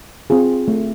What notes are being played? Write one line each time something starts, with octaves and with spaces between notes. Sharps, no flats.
C4 F4 G#4
A3